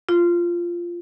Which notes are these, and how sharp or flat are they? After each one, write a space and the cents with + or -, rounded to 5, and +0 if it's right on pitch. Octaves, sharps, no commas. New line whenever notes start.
F4 -10